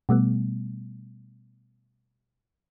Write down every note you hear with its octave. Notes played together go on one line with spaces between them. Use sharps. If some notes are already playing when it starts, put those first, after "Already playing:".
B2 G3 A3 B3